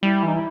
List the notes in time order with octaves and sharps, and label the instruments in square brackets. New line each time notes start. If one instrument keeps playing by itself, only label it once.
[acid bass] G3 [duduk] E4
[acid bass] E3 [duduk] D#4
[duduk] E4